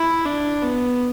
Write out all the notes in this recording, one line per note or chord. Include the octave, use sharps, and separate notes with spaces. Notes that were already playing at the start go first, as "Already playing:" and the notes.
Already playing: E4
D4
B3